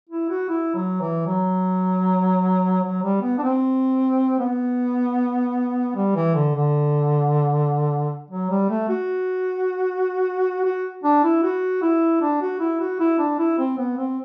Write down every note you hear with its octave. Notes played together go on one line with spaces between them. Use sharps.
E4
F#4
E4
F#3
E3
F#3
F#3
G3
B3
D4
C4
B3
G3
E3
D3
D3
F#3
G3
A3
F#4
F#4
D4
E4
F#4
E4
D4
F#4
E4
F#4
E4
D4
E4
C4
B3
C4